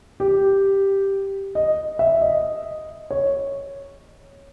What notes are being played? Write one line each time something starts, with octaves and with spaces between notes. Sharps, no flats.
G4
D#5
E5
D#5
C#5